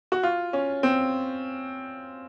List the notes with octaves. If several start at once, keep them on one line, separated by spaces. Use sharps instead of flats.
F#4
F4
C#4
C4